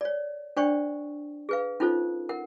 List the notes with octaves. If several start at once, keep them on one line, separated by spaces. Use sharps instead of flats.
C#5 D5
D4 C5 D5 G5 C#6
G#4 B4 F5
C#4 D#4 F4 A4 C5
A#4 F#5